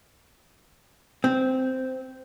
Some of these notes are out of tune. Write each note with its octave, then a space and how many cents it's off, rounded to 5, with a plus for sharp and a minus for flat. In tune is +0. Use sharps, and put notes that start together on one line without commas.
C4 -10